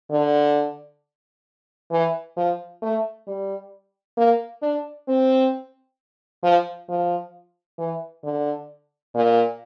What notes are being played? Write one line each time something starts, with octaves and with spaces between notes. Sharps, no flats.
D3
E3
F3
A3
G3
A#3
D4
C4
F3
F3
E3
D3
A#2